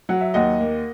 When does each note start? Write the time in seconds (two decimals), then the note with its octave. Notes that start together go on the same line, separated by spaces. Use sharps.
0.09 F#3 F#5
0.21 E5
0.34 D#2 D#5 F#5
0.60 A#3